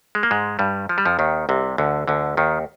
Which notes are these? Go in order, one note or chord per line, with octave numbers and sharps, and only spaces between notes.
G#3
A#3
G#2 G#3
G2 G3
F3
G3
F2 F3
D#2 D#3
C2 C3
D2 D3
D2 D3
D#2 D#3